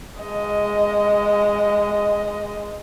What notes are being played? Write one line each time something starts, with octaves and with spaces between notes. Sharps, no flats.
G#3 D#5